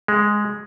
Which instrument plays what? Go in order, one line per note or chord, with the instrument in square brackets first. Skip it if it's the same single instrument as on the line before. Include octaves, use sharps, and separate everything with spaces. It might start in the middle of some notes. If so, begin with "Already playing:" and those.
[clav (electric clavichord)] G#3